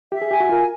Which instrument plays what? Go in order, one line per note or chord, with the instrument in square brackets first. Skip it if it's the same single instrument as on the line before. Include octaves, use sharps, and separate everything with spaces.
[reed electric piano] G4 [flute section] E5
[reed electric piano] G#4
[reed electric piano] G4 [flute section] G#5
[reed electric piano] F#4
[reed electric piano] F4 [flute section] A#4